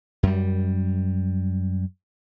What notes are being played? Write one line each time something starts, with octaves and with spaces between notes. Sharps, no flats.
F#2 G3